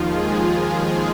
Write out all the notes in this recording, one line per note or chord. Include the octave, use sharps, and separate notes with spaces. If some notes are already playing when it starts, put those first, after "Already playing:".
Already playing: D#2 D#3 F3 F4
G#3 G#4